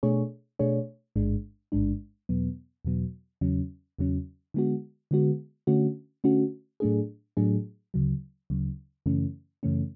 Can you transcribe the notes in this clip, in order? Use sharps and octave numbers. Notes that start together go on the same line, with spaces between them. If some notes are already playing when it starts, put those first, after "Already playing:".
B2 A3 D4 G#4 C#5
B2 A3 D4 G#4 C#5
A1 G#2 G#3 D4
A1 G#2 G#3 D4
E2 B2 F#3 B3
E2 B2 F#3 B3
E2 C#3 F#3 C#4
E2 C#3 F#3 C#4
D3 G#3 B3 F#4
D3 G#3 B3 F#4
D3 A3 C#4 F#4
D3 A3 C#4 F#4
A2 F#3 A3 D4 G#4
A2 F#3 A3 D4 G#4
D2 C#3 F#3
D2 C#3 F#3
F#2 C#3 E3 A3 C#4
F#2 C#3 E3 A3 C#4